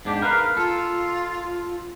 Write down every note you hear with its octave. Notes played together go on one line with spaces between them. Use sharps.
G#2 D4 G4
A#4 B4 F5
F4 A4